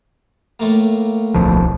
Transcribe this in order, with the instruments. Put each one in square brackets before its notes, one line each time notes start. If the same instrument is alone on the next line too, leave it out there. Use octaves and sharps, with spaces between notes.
[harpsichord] A2 A3 A#3
[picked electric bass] D1 B1 F3